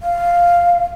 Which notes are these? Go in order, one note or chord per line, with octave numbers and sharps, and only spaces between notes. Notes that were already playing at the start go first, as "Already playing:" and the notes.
F5